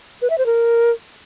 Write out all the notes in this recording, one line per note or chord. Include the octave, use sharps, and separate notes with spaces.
B4
E5
C5
A#4